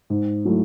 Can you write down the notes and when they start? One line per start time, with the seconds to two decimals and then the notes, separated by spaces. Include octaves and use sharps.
0.10 G#2
0.45 F#3 A3 E4